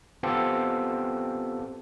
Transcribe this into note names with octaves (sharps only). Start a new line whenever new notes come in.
B3 C4 F4 G4 A4